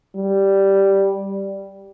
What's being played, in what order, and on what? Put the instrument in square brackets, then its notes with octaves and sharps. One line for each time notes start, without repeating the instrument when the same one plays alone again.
[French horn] G3